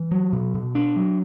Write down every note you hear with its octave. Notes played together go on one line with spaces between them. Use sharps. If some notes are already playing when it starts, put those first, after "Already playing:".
Already playing: E3
F#3
B2
B2
D4
F#3